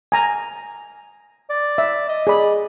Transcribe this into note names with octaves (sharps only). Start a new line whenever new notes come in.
G#5 A#5
D5
E5
D#5
G#4 D5 B5